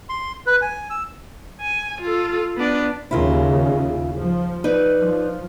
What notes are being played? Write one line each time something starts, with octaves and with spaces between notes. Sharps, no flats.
C6
B4
G#5
E6
G#5
F4 A4
B3 D4
D#2 C#3 E4 F4 A#4
F3
D#4 B4 D5
F3